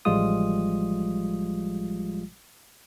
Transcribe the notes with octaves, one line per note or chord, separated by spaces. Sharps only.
A1 F3 G3 G#3 F4 D#6